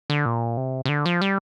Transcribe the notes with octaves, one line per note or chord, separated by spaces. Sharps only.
D3
A#2
C3
C3
D3
F3
G3